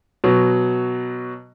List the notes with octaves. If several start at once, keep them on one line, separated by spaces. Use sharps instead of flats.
B2 F#3